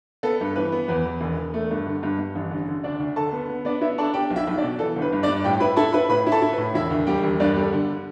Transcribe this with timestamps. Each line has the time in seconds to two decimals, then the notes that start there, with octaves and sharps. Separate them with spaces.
0.23 B3 A4
0.41 G2
0.56 E3 B4
0.72 B3
0.88 E2 B4
1.06 E2
1.21 E1
1.37 E1
1.54 A3
1.71 G2
1.86 D3
2.03 G2
2.18 G2
2.35 A1
2.51 D3
2.68 D3
2.83 D2 D4 D5
3.00 D2
3.16 D3 A4 A5
3.32 B3
3.49 B3
3.65 B3 D4 D5
3.81 B3 E4 E5
3.98 D4 A4 A5
4.14 D4 G4 G5
4.30 B1
4.36 E4 E5
4.47 B1
4.58 D4 D5
4.63 B2
4.79 E3 A4
4.96 G1
5.02 B4
5.13 G2
5.23 D4 D5
5.28 G2
5.44 A2 G4 G5
5.60 E4 B4 B5
5.76 E4 A4 A5
5.93 E4 B4 B5
6.09 A2 B4 B5
6.26 E4
6.32 A4 A5
6.42 E4
6.52 B4
6.58 A2
6.74 E1 E4 E5
6.90 D2
7.07 G3 G4 G5
7.23 E1
7.40 G2 D4 D5
7.56 G3
7.61 A4
7.72 D3